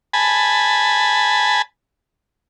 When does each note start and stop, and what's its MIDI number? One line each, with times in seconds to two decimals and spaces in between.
0.13 1.62 80
0.13 1.62 81
0.13 1.62 83